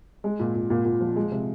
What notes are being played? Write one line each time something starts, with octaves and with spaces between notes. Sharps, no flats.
G#3
A#2
A#2
A#2
A#2
F3
G#3
C3